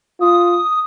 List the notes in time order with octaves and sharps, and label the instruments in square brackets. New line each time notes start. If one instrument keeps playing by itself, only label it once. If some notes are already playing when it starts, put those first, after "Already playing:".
[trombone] F4 [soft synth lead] D#6